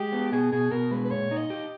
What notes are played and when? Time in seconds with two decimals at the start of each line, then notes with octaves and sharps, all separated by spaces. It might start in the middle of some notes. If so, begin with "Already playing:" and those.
Already playing: G#3 G4
0.13 B3
0.32 B2 G#4
0.52 B2 G#4
0.72 B2 A#4
0.91 G#3 B4
1.05 B4
1.10 A#2 C#5
1.31 D#4
1.37 D#5
1.50 G4